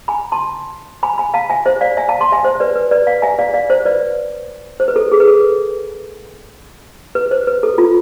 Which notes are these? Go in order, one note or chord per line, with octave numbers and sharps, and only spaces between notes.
G#5 B5
A5 C6
G#5 B5
G#5 B5
F5 A5
E5 G#5
C5 E5
D5 F5
E5 G#5
F5 A5
A5 C6
E5 G#5
C5 E5
B4 D5
B4
B4 D5
D5 F5
E5 G#5
D5 F5
D5 F5
C5 E5
B4 D5
C5
B4
A4
G#4
B4
A4
B4
C5
B4
A4
F4